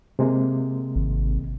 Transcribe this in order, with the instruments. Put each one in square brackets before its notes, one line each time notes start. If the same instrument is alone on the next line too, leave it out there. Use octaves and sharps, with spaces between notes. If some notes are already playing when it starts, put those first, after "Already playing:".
[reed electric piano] C3 G#3 A#3
[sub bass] G#1